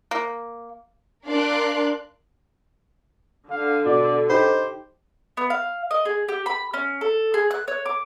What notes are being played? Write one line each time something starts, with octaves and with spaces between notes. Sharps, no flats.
A#3
D4 A#4 D5 F5 C6 F#6
D3 F5
B2 D5
D#4 G4 C5 B5
B3
F5
D#5
G#4
G4
B5
C#4
A4
G#4
F#6
C#5
D6